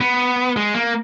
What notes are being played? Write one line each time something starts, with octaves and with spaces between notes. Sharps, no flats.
B3
G#3
A#3